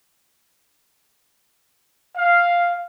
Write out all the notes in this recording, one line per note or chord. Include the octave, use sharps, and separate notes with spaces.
F5